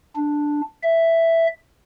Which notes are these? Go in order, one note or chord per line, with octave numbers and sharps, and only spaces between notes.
D4
E5